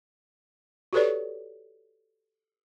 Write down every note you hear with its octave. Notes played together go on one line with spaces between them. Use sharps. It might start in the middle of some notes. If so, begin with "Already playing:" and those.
F#4 G4 A4 B4 C#5 D5